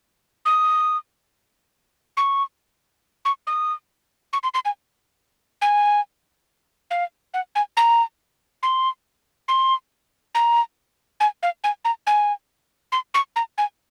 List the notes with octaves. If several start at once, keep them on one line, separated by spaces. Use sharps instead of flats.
D#6
C#6
C#6
D#6
C#6
C6
C6
G#5
G#5
F5
F#5
G#5
A#5
C6
C6
A#5
G#5
F5
G#5
A#5
G#5
C6
C#6
A#5
G#5